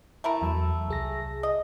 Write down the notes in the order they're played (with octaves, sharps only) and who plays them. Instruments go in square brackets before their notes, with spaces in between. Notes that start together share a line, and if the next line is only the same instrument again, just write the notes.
[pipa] A3 E4 A#4
[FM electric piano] E2 F#3 E6
C2 G#4 A#6
[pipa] D#5